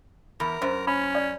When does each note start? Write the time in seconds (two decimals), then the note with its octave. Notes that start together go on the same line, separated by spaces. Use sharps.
0.40 E2 A#4
0.62 F#2 C5
0.87 C#4 B5
1.15 D5